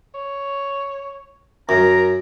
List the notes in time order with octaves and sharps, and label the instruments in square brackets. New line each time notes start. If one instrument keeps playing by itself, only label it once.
[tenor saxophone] C#5
[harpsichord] F#2 [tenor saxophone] A#4 [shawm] A#5